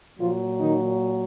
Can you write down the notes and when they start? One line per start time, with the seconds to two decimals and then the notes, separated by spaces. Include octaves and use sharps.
0.18 A#2 F3 F#3 F4
0.59 D#3 D#4